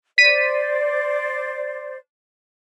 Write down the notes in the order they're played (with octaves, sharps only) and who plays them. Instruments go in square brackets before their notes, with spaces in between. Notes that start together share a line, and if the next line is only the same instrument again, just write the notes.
[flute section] C5 D5 [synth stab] B6 D#7